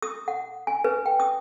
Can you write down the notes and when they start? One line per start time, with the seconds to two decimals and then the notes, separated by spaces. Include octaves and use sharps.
0.02 D#6
0.28 F#5
0.67 G#5
0.84 B4
1.06 G5
1.20 D#6